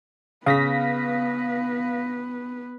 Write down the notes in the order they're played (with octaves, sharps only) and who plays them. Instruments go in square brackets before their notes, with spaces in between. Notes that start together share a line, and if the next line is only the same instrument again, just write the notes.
[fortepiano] C#3 [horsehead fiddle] B3 B4 [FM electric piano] F5 A#6 B6